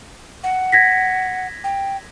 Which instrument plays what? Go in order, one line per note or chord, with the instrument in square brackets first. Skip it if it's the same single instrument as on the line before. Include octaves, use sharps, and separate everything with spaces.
[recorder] F#5
[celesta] G#6 A#6 B6
[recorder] G5